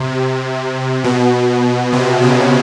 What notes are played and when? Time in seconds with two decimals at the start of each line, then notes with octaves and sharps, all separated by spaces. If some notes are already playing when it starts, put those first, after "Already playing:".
Already playing: C3
1.04 B2
1.92 C3
2.22 C#3